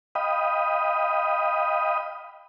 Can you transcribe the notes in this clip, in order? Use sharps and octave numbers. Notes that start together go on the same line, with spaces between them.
D#5 F5 G5 B5 D#6